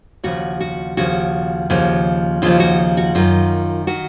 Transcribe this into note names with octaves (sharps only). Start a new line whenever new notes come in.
D#2 C#3 F3 F#4
F#4
D#2 C#3 F3 F#4
D#2 C#3 F3
D#2 C#3 F3 F4
F#4
F#4
F#2 D#3 F4
D#3 F#4